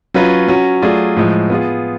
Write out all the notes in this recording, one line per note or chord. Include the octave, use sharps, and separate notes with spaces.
F#3 C#4 F4 B4
F#3 C#4 F#4
F#3 A3 F4 G#4 D5
A2 F3 G#3
B3 F4 G#4